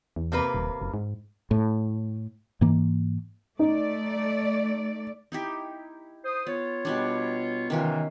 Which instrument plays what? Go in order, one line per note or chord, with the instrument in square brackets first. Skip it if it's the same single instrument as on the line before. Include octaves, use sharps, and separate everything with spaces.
[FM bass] E2
[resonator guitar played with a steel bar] C3 A#3 B4
[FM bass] D#1
F#1
G#2
[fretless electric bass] A2
G#2 E3 A#3
[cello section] A3 D5 [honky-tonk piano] D#4
[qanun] D#4 E4 G4
[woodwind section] C5 D#6
[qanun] B3 [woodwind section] F4 C#5
[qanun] B2 G3 D4
[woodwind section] C3 E3 [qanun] D#3 C#4 F4